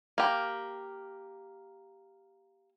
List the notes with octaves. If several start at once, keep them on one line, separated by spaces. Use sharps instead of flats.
A#3 G4